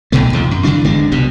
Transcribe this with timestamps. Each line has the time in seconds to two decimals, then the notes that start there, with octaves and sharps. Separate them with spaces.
0.12 A#1 D#2 B2 A3
0.33 D#2 C3 F3
0.51 F#2
0.64 C#3 E3 D4
0.84 G1 D#2 G#3 D4
1.12 C2 B2 G3